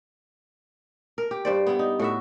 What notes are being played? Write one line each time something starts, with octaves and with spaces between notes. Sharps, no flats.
A#4
G4
G2 C5 D5
B3 E4
D#4
A2 F#4 E5